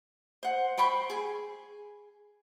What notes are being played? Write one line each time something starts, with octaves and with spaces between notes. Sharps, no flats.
C5 F#5
C5 G5 B5 C#6
G#4 G#5